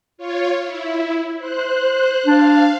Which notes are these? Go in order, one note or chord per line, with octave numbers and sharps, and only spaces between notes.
F4 C#5
E4
C5 F#6
D4 F5